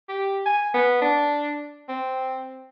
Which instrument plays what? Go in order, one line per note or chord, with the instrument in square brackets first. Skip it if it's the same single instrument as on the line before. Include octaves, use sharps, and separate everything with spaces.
[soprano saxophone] G4
G#5
B3
D4
C4